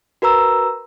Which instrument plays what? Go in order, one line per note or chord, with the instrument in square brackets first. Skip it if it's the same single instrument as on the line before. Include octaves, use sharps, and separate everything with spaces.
[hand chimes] F#4 A#4 B4 A#5 E6